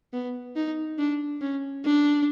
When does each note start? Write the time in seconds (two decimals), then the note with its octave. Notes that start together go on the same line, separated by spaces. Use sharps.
0.13 B3
0.56 D#4
0.99 D4
1.42 C#4
1.85 D4